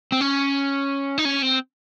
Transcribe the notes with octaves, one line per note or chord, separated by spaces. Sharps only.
C4
C#4
D#4
C#4
C4